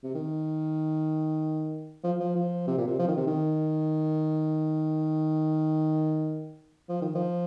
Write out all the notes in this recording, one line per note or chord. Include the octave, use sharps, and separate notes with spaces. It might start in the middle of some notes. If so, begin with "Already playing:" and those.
C3
D#3
F3
F3
F3
C3
A#2
C3
F3
D#3
C3
D#3
F3
D#3
F3